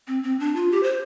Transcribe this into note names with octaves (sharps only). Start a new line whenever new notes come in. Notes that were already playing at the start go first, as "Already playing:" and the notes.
C4
C4
D4
F4
G4
C5